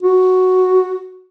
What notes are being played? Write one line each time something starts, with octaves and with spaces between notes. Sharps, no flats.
F#4